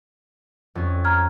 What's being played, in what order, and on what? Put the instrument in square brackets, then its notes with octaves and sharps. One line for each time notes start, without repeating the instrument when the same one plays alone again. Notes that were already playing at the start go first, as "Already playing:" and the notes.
[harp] F2 C#4
[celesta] A#5 F6 G#6